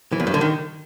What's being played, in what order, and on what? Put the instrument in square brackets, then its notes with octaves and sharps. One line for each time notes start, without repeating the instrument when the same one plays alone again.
[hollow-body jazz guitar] E3
E2
G2
D3
D#3